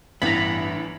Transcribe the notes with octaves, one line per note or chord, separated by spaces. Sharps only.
A1 G2 E3 B3 D4 A#5 B5